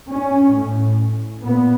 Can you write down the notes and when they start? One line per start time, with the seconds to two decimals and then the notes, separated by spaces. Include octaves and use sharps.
0.10 C#4
0.54 A2
1.43 A#2 B3